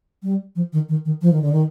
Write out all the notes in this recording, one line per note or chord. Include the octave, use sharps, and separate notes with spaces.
G3
F3
D#3
D#3
D#3
F3
D#3
D3
D#3